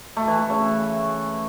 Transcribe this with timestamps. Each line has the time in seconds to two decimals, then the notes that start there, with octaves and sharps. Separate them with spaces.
0.17 A3
0.28 E3
0.39 A3
0.50 C#3